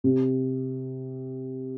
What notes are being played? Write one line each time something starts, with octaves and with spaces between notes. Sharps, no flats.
C3